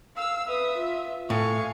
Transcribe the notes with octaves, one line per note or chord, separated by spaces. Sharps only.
F5 E6
B4 E5 D#6
F4
A2 F5 G#5 C#6